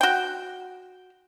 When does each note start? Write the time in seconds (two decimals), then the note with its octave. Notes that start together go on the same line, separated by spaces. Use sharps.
0.01 F#4 G5